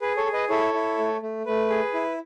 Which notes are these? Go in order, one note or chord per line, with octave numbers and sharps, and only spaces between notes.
G#4 B4
A4 C#5
G#4
B4 D#5
E4 A4 C#5
E4
A3
A3
A3 B4
G#4
E4